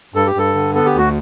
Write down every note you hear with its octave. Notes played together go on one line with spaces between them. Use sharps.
G2 A4
G4
G2 A4
D3
B3 A4
G4
D2 F#4